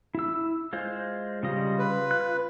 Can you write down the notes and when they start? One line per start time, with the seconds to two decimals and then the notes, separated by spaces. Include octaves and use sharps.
0.15 E4 E6
0.73 G#3 F4 C5
1.43 C#3 G3 F4 D#5
1.79 B4
2.11 F#6